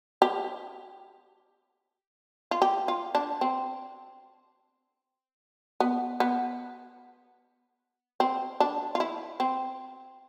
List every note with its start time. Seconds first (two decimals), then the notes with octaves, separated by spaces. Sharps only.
0.22 G4
2.51 F4
2.62 G4
2.88 F4
3.15 D4
3.41 C4
5.80 B3
6.20 B3
8.20 C4
8.60 D4
8.95 F4
9.00 E4
9.40 C4